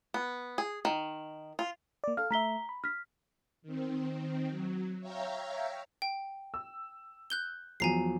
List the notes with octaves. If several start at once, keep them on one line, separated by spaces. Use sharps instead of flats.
B3
G#4
D#3
F4
A#3 D5
A4 F5 F6
A3 E5 A#5 B6 G7
B5
F6 B6
D#3 C4
F#3
C#5 E5 F5 G5 A#5
G5
E6
F#6 G6 G7
E2 F3 F#3 G#5 A#5 C7